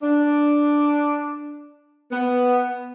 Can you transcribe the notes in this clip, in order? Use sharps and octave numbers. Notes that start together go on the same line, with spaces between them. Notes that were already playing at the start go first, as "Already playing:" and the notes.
D4
B3